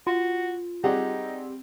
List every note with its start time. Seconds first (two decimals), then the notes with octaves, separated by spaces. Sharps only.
0.07 F4 F#4
0.84 G3 C4 D#4 G4 G#4 F#5